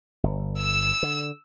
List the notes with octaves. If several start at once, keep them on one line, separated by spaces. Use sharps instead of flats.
G1
E6 E7
D3